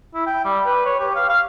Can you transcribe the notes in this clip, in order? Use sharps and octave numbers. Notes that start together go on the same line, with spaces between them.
E4
G5
G3
B4
C#5
G4
F5
F5